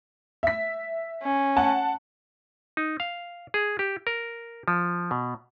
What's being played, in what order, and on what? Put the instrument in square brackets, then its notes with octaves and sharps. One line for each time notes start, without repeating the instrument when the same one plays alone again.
[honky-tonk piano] E5 B6
[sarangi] C#4
[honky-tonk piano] F#5 A5
[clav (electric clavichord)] D#4
F5
G#4
G4
A#4
F3
B2